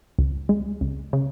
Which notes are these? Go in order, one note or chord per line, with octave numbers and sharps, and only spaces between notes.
C#2
G#3
C#2
C#3